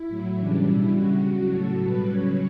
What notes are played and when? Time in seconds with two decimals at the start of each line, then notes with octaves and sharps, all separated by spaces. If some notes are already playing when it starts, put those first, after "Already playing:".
Already playing: E4
0.08 A2 F#3
0.37 C#3 E3 G3 D4
0.65 B2 G3 E4
0.94 C#3 G3 F#4
1.22 C#3 F#3
1.51 A2 F#3 A4
1.79 B2 G3 B4
2.08 C#3 F#3 C#5